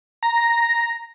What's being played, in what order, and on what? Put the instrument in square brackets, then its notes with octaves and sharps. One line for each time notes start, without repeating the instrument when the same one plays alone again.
[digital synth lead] A#5